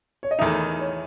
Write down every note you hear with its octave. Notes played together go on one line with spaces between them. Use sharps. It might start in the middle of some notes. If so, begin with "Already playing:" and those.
C#5
D#5
E2 D#3 A3 D#4 E5
C#5